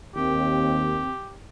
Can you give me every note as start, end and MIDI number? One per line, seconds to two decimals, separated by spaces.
0.16 1.06 39
0.16 1.09 60
0.16 1.37 67